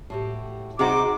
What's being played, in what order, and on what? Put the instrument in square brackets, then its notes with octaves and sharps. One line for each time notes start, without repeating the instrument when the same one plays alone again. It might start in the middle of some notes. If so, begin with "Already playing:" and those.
[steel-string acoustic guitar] A2 F#4 G4
[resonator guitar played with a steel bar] C3 D#4 F#4 [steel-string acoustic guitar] G#4 C5 D#5 [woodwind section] D6